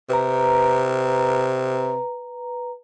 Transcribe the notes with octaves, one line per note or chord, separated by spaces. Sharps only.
C3 B4 A#5